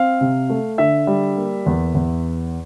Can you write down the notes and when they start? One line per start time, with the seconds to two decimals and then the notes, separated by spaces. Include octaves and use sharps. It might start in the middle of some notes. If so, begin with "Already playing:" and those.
Already playing: C4 F5
0.21 C3
0.49 A3
0.78 D3 E5
1.07 G3
1.36 A#3
1.66 E2
1.95 E2